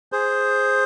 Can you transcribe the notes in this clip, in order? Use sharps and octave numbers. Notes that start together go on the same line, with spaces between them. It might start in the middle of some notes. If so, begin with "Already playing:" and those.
G#4 C5